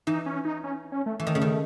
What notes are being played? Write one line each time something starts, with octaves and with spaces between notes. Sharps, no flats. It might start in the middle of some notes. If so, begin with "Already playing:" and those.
E3 D#4
C#4
D#4
C#4
C#4
A3
E3 A3
D#3
C#3
D#3